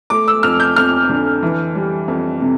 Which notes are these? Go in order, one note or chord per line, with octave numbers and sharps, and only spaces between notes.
A3 D6
E6
F2 F6
G6
F2 F6
D3
E3
G3
F2
C3